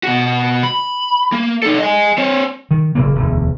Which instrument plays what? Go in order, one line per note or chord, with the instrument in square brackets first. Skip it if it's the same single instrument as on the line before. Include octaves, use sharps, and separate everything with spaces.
[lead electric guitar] B2 F#4
B5
A#3
D#4 A4
D#5 G#5
C4 C#5
[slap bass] D#3
F#1 A#2 C#3 A#3
E1 D2